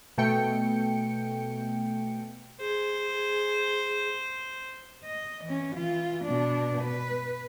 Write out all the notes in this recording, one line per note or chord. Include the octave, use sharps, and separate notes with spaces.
B2 A3 G5 C#7
G#4 C5
D#5
E3 C#4
E3 F4
B2 D4
B4